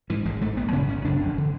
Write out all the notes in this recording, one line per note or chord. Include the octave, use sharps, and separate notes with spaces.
G#2 E3
G#1 G#3
G#2 A3
G#1 B3
F#2 C#3 C#4
G#1 C#4
F#2 C#3 D4
E1
D3